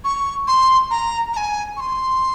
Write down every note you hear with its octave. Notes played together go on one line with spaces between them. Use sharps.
C#6
C6
A#5
A#5
G#5
C#6
C6